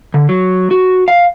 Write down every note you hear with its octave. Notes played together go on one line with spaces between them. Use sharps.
D3
F#3
F#4
F5